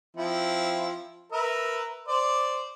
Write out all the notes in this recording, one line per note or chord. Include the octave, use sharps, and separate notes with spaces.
F3 C4 E4
A#4 B4 E5
C5 D5